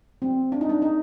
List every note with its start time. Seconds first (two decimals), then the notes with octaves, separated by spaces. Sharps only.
0.22 C4
0.52 D4
0.61 D#4
0.69 D4
0.82 D#4